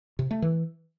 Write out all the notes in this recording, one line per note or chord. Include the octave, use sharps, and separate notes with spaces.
C3
A3
E3